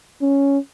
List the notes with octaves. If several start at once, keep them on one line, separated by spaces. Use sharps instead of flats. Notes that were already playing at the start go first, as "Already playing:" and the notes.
C#4